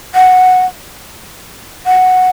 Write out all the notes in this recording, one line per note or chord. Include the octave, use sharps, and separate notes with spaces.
F#5
F#5